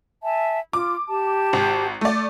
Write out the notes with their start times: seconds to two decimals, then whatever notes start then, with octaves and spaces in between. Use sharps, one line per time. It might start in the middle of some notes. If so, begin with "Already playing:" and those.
0.22 E5 G#5 A5
0.73 F4 D6
1.09 G4 A5
1.53 G#1
2.01 A3 D5